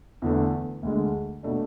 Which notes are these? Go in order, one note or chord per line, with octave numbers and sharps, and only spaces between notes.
E2 D3 A3
D2 D3 G#3
B2 A3 D4